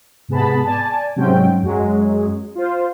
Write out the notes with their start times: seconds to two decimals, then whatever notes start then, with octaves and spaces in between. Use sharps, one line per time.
0.28 G#2 C3 B3 G#4 A5 B5
0.64 D5 G#5 A5
1.16 G#2 C3 F#3 C4 C#4 G5
1.63 F#2 F#3 G#3
2.55 F4 C5